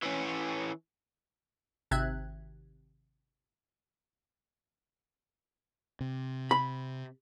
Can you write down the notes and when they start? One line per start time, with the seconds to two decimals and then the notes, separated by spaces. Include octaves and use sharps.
0.02 E3 C#4
1.91 G#1 C3 C4 E5 F#6 G#6
6.01 C3
6.51 B5